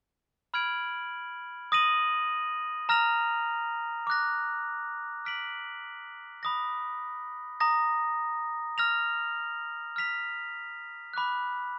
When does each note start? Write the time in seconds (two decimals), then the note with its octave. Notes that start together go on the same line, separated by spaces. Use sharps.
0.54 B5 F6 G#6 D7 F#7
1.72 D#6 A#6 D#7 F#7
2.89 A#5 F6 A#6 F7
4.07 D6 F#6 A#6
5.25 F6 B6 D7 F#7
6.43 B5 D#6 A#6
7.60 A#5 D#6 A#6
8.78 F6 A#6 F7
9.96 F6 B6 F7
11.13 B5 D6 F#6